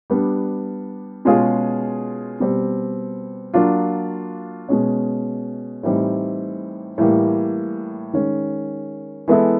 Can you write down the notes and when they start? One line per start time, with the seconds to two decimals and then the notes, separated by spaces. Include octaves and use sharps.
0.10 G3 B3 D4
1.25 B2 G#3 C#4 F4 G#4
2.40 B2 G3 C4
3.54 F#3 A#3 D4 F4
4.69 B2 G#3 C#4
5.83 A2 E3 G3 C4 D#4
6.98 A2 E3 G3 A#3
8.13 D#3 G#3 C#4
9.28 E3 G#3 B3 E4 A4